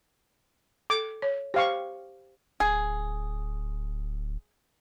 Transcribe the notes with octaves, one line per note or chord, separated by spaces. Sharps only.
A4 D6
C#5
G4 C5 F5 C#6
D1 G#4